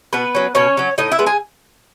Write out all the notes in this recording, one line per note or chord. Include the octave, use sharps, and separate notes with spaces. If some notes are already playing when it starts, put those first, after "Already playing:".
B2 B3 B4
F#3 C#4
B2 C#4 C#5
F#3 C#4
A2 D#4 D#5
E4 E5
G#3 B3
G#4 G#5